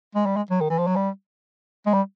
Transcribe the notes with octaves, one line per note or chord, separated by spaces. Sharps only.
G#3
G3
G#3
F#3
D#3
E3
F3
F#3
G3
G#3
G3